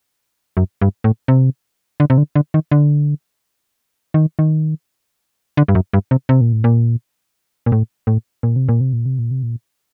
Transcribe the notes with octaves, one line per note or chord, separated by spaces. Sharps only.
F#2
G2
A2
C3
D3
C3
D3
D3
D#3
D3
D#3
D#3
D3
G2
F#2
G2
C3
C3
A#2
A2
A#2
A#2
A2
A2
A#2
C3
A#2
C3
A#2
C3
A#2
C3
A#2